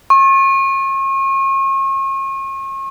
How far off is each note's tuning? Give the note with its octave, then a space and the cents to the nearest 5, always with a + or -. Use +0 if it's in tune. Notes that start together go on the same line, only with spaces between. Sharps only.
C#6 -40